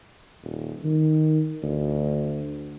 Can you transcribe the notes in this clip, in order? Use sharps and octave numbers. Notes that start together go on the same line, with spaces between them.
D#1
D#3
D2